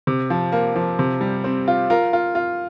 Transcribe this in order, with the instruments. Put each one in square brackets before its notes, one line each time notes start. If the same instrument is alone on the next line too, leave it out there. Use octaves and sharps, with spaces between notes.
[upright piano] C3
F3
A#3
F3
C3
G3
C4
F4
F4 A#4
F4
F4